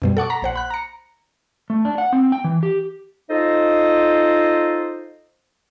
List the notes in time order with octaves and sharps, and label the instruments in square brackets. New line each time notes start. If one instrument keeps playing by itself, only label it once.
[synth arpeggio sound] F#2 B2 G3
A4 F#5 C#6 D6
A#5 B6
A#1 C5 F#5
B5 F#6
A#5 C#7
[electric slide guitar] A3
D4
F#5
C4
G5
E3
G4
[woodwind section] D#4 F4 A4 C5 D#5